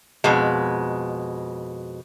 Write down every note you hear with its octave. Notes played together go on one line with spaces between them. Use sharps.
F2 B2 G#3